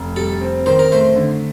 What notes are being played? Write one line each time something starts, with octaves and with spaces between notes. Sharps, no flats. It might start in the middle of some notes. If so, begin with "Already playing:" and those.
Already playing: F1
G3 A4
C4
D#3 C5
A#4
A3 C5
D3